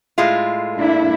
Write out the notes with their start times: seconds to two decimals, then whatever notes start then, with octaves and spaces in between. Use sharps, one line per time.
0.18 A2 G#3 F4
0.75 A#3 D4 E4